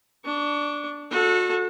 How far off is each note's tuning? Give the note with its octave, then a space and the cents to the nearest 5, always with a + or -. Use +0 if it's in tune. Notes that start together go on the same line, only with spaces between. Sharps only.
D4 +0 C#6 +30
F#4 -30 A4 +0